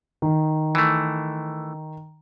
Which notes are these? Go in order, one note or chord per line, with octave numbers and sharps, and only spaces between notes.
D#3
E3 A3